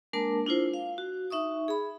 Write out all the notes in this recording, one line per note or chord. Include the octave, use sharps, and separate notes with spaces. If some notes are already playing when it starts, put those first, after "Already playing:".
G#3 A#3 D4 A#4 A5 D6
D4 E4 F4 C5
F5
F#4
D#4 E5 C#6 D#6
G#4 B5